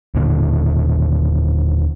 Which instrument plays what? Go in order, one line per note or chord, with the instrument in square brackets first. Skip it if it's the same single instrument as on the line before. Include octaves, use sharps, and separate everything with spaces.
[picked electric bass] D#2 A#2 D3 A#3